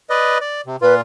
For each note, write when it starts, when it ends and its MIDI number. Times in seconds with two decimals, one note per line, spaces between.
0.10 0.38 71
0.10 0.38 74
0.10 0.38 75
0.41 0.61 74
0.66 0.76 48
0.82 1.01 46
0.82 1.01 65
0.82 0.94 71